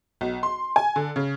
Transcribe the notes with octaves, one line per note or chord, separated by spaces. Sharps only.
B1
C6
G#5
D3
C#3